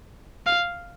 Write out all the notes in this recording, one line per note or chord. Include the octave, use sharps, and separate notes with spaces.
F5